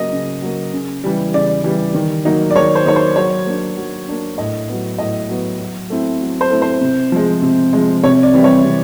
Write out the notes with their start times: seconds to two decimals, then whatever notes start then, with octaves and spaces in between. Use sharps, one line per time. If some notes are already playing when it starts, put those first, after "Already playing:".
Already playing: C#3 F#3 A#3 D#5
0.12 C#3
0.42 F#3 A#3
0.73 C#3
1.04 E3 G3
1.34 C#3 D5
1.64 E3 G3
1.95 D#3
2.25 F#3 A#3 D#4
2.51 D5
2.55 D#3 C#5
2.75 C5
2.86 F#3 A#3 D#4 C#5
2.96 C5
3.16 F#3 C#5
3.46 A#3 D4
3.77 F#3
4.08 A#3 D4
4.38 A2 D#5
4.68 F#3 B3
4.98 A2 D#5
5.30 F#3 B3
5.59 F#3
5.90 A3 C4 E4
6.21 F#3
6.41 C5
6.51 A3 C4 E4
6.62 C5
6.81 C3
7.12 F3 G#3
7.42 C3
7.73 F3 G#3
8.03 C3 C#5
8.23 D5
8.34 E3 G3 C4 E4
8.44 C#5
8.65 C3